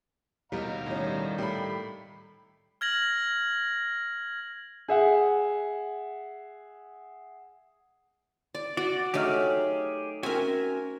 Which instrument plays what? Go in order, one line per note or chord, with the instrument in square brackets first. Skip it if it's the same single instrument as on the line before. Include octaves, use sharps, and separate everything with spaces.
[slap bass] D#2 B2 [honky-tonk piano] G3 [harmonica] D#5 F5 A#5
[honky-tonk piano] A2 C#4 [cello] D#3 G3
[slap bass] A2 [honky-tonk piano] G4 B5
[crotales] F6 G#6 A#6 F#7
[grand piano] G#4 E5 F#5
[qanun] D5
[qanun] F#4 [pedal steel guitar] D5
[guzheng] F#3 A3 D#4 [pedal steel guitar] G4 G#4 F6
[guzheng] C4 [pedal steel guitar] C#4 F#4 E5 [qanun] A#4 G#5